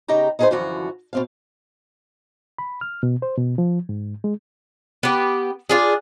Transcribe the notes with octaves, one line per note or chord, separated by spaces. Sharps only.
C#3 D#4 G4 G5 A#5
D#4 E4 G#4 A4 B4 C5
F#2 D3 E3 F3 F#4
B2 C4 F5
B5
F6
B2
C5
B2
F3
G#2
G#3
B3 G4
D4 F4 G#4